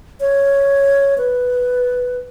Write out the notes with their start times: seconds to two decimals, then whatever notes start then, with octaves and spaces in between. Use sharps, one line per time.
0.20 C#5
1.18 B4